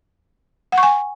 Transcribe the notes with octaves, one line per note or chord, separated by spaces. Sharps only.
F#5
C#6
G#5